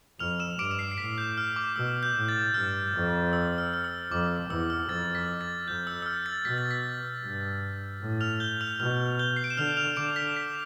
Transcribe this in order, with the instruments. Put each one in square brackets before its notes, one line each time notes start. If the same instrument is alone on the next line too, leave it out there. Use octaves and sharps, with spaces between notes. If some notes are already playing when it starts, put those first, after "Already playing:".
[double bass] F2 [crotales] F6 F7
[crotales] E6 E7
[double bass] G2 [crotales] D6 D7
[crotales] D7
C7
C7
[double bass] A2 [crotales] B6
[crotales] G6
F6
D6
[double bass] B2 [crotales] E6
[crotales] G6
[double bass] A2
[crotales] A6
[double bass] G2 [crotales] F6
[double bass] F2
[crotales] E6
F6
F6
E6
[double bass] F2 [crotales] D6
[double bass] E2 [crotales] E6
[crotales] F6
[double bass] F2 [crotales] A6
[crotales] B6
A6
[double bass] F2 [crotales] G6
[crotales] E6
E6
F6
A6
[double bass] B2 [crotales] B6
[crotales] A6
B6
[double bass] G2
A2
[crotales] F6 F7
G6 G7
F6 F7
[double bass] B2 [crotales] F6 F7
[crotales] G6 G7
C7
D7
E7
[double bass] D3 [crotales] F6 F7
[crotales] F6 F7
[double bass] D3 [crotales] D6 D7
[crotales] B6
B6